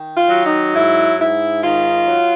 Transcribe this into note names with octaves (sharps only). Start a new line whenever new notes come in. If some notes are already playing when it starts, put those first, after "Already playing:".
Already playing: D#3
F4
F#3
D#4
G#2 E4
G#2 E4
D#3 F4
F#3